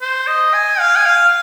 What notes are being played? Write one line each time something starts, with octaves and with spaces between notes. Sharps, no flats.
C5
D#5
G#5
F5
G#5
F5